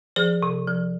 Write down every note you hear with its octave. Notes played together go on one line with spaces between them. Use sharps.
F3 G#4 C5
C3
F3